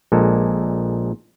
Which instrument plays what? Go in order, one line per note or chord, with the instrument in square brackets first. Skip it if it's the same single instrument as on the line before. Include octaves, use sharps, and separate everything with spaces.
[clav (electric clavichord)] A#1 A#2 G#3 A4